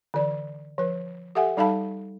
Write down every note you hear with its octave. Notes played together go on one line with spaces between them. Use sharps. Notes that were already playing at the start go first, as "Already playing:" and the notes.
D3 E3 D5
F3 B4
G4 A4 E5 F#5 G#5
G3 D#4 A4 F5 A5 B5